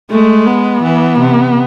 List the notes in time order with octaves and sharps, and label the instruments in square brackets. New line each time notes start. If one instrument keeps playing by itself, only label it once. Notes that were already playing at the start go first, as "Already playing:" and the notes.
[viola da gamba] G#3 [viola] A3
[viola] B3
[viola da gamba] E3
C3